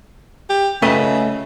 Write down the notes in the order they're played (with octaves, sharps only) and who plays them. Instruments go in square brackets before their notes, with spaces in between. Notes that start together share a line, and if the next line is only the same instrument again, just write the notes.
[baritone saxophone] G4
[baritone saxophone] C#3 [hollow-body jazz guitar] A3 B4 D#5